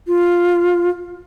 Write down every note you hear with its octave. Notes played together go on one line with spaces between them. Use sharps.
F4